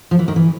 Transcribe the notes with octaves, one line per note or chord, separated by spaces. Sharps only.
F3
E3
D#3
E3